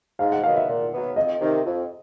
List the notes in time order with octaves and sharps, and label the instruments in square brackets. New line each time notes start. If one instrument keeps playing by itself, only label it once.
[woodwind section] G#2 [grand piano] F5
[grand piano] F#5
[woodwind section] D#3 F#3 B3 [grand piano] F5
[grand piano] E5
[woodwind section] A#2
F#3 B3
[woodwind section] F2 [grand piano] D#5
[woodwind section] C3 D#3
F2